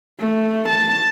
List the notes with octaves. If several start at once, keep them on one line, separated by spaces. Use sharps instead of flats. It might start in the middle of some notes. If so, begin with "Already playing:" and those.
A3
A5